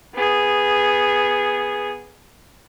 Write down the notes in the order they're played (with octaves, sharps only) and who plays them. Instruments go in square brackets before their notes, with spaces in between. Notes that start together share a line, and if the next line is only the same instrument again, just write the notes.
[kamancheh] B3 G#4